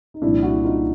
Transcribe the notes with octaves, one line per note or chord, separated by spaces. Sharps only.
D#4
C2 A#2 F3 D4 E4
E4 F#4
D#4 F4